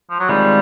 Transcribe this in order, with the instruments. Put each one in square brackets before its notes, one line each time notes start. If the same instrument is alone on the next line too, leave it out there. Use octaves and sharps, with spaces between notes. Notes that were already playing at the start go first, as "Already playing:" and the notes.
[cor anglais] F3
F#3
[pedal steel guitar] D#3 G#3 C4 F4 G#4 [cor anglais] G3